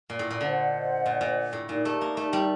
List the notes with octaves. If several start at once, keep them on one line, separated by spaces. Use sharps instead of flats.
A#2
A2
A#2
D3 C5 D#5 F#5
A#2
A#2
A2
A#2 D#4 G4 A#4 D5
A3
A#3
A3
G3